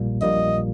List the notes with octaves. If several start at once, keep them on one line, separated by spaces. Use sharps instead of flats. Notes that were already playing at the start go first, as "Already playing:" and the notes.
Already playing: A#1 A#2 G3 A#3
A#1 A#2 G3 A#3 D#5